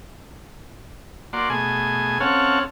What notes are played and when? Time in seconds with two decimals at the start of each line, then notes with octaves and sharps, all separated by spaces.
1.33 A#3 F#4 D5 C6
1.50 B2 A3 G#4 G#5
2.20 C4 C#4 A4 C#5 F5 F#5